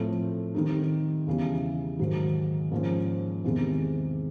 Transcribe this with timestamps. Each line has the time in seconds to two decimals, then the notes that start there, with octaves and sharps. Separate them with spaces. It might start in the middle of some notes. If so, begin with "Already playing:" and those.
Already playing: A2 F3 A3 C4
0.55 D#3 G3 C4 D#4
1.27 E2 C#3 E3 G3
1.99 G#2 D#3 F#3
2.71 G#2 F3 A#3 C#4
3.44 E2 C3 D#3 G#3